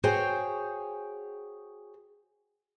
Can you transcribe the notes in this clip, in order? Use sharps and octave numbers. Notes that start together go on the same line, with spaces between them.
F#4 G#4 C5 C#5 G5 G#5